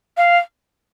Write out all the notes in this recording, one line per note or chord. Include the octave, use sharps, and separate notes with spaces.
F5